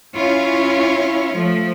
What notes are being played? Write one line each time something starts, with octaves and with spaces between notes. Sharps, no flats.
C#4 E4 F4 C#5
F3 A3